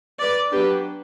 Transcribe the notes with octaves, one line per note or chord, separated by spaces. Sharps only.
B4 D5
F#3 B3 D4 G4 B4